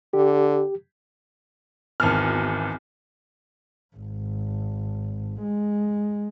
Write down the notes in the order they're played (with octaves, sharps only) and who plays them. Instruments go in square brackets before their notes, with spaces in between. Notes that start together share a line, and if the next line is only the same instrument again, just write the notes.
[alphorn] D3 [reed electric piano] G4
[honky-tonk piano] G#1 E2 F6
[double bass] G#1
G#3